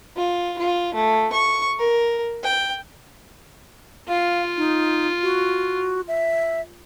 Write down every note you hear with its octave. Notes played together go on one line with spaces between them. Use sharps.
F4
F4
A3
C#6
A#4
G5
F4 F5
D#4
F#4
E5